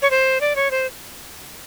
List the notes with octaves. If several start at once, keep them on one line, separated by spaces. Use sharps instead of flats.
C#5
C5
D5
C#5
C5